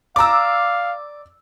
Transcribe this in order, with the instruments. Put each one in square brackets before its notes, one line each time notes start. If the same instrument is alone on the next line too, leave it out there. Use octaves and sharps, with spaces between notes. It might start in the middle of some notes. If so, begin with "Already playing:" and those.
[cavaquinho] D5 A#5 [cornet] F5 [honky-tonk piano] D6 E6